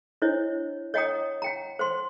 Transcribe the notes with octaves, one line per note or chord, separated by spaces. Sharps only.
D4 E4 C5 C#5 D#5
C#5 D#5 F#5 G5 A#5 D#6
F#5 G5 A#5
C5 F#5 C6